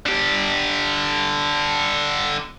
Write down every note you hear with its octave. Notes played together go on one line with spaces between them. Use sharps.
D3 G4